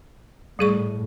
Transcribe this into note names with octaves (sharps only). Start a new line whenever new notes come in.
A2 G3 G#4 C#6